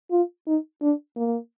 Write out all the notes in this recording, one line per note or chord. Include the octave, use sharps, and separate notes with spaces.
F4
D#4
D4
A#3